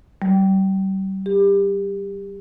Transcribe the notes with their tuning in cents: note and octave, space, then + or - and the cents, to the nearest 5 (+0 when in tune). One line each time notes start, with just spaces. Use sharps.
G3 -35
G4 +25